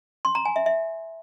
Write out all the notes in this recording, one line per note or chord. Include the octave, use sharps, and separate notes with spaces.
C6
A#5
G#5
E5
E5